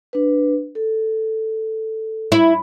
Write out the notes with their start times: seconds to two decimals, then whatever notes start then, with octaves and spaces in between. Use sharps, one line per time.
0.13 D4 B4
0.75 A4
2.32 E4